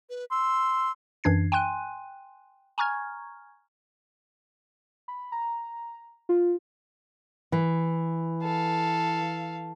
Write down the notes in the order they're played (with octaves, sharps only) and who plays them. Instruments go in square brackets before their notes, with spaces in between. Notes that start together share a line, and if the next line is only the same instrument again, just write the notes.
[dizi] B4
[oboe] C6 [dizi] E6
[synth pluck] F#2 E3 D4 G#6 C7
G5 G#5 C6 F#6 D#7
G#5 A#5 C#6 F6 G#6
[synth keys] B5
A#5
F4
[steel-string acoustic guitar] E3
[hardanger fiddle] A4 F5